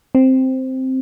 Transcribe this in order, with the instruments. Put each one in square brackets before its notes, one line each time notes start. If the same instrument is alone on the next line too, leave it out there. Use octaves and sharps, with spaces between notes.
[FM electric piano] C4